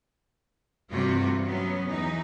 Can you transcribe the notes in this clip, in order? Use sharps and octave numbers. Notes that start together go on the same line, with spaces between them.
G2 C3 E3 A3 F4 F#4
F#3 B3 C#4
E2 E3 D#4